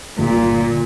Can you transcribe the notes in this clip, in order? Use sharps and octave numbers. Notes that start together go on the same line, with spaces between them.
G1 A#2